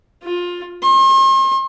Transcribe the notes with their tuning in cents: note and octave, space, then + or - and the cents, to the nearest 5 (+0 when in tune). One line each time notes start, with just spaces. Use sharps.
F4 +20
C6 +45